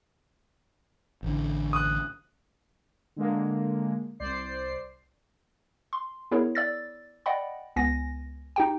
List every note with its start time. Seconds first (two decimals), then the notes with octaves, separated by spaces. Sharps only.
1.23 A1 D3
1.73 D#6 F#6
3.16 D3 G#3 A#3
4.20 C2 C5 D5 C7
5.93 C6
6.31 B3 E4 G#4 A#4 C#5
6.55 D5 E6 A6
7.26 D5 D#5 F#5 G5 B5
7.76 C#2 B3 G#5 A#6
8.56 D#4 G4 G5